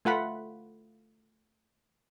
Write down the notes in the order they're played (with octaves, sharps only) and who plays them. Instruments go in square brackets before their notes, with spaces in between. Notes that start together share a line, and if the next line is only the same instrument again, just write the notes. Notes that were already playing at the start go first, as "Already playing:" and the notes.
[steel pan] A3 F4 F#5 B5